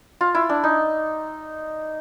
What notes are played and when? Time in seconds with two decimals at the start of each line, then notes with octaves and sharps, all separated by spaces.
0.21 F4
0.35 E4
0.49 D4
0.64 D#4